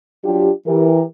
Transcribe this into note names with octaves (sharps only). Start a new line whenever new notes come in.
F#3 D4 F4 G4
E3 G4 A#4